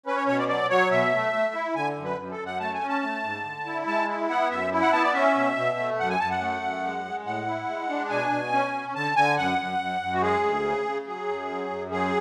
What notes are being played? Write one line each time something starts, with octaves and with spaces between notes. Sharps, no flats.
C#4 B4
C#5
B2 C#5
D5
F#3 D5
F#3 C#5
B2 E5
A3
A3
E4
D3 G#5
F#2
B4
F#2
A4
F#2
F#5
A3 A5
G#5
C#4
A5
A3
G#2
D3
E4
G#3 A5
E4
B3 F#5
F#2 E5
E4
F#5
B3 A5
D5
C#4 E5
B2
B2
A3
F#2 F#5
G#5
F#2 A5
F#5
A3
F#2
G#3
G#3
A2 F#5
E4
G#3
D4
B2 G#5
B2
C#4
C#4
D3 A5
D3 G#5
F#2 F#5
F#2
F#2
F#2
F#4
G#3 G#4
D2
C#3
C#3
F#3 G#4
F#2
F#3
F#2
F#3 G#4